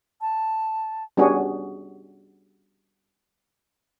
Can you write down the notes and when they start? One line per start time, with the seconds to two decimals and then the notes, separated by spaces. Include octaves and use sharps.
0.21 A5
1.17 G3 B3 C#4 D4 F#4 G#4